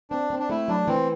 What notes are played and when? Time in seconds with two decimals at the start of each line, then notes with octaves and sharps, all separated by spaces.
0.10 C4 D4
0.30 C4
0.39 D4
0.50 A3 E4
0.68 F#3 D4
0.88 E3 C4